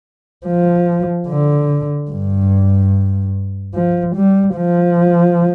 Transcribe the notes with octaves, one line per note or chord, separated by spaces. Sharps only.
F3
D3
G2
F3
G3
F3